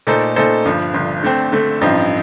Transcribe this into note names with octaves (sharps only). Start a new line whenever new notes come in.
A#2 A3 D#4 A4 C5
A#2 A3 D#4 A4 C5
G1 G2 F3
G1 G2 F3
D3 A3 C4
D3 A3 C4
A1 G2 F3 C4 D#4